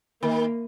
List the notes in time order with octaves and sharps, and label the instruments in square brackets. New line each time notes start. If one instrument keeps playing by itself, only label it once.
[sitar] D#3 [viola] A#3